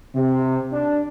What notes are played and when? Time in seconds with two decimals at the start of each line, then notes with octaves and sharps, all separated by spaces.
0.16 C3
0.73 D4